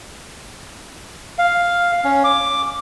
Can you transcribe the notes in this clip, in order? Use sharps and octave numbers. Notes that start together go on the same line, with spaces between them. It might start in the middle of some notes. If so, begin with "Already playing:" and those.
F5
C#4
D6